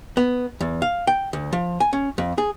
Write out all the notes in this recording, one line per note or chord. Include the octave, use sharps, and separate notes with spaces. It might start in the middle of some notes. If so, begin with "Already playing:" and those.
B3
E2
F5
G5
D2
F3
G#5
C#4
F2
G#4